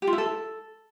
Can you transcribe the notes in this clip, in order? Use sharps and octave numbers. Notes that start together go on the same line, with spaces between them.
G4
F4
E4
A4